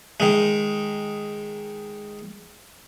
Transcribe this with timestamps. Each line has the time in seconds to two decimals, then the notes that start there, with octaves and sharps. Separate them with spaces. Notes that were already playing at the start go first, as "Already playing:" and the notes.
0.20 D#3 G#3